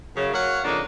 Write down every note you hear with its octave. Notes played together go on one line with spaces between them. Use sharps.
F#2 C#3
F#3 A#3 C#5 F5 F#5
F2 C#3 A#3 D4 D#4